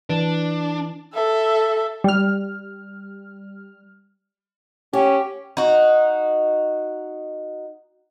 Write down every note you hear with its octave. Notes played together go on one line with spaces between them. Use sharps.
E3 D4
A4 E5
G3 F6
C#4 G4
D#4 F#4